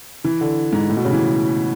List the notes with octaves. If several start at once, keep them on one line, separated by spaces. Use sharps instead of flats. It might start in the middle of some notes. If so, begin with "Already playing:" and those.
E3
D3
G#2
A2
B2
C#3
E3